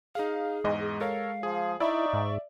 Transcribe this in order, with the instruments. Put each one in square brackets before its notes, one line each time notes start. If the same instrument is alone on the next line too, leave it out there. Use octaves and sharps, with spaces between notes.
[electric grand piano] D#4 F5 [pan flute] G#4
[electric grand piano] E2 G#2 D#5 [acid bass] G#3
[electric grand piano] A4 A#4 C#5 [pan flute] F5
[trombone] F3 [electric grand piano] G#4
[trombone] D#4 [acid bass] E4 [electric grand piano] D5 E5 [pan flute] C#6
[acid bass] G#2